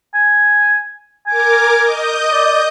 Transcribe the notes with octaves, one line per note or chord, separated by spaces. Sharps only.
G#5
A#4 G#5 D6
D#5 D#6 G6
D5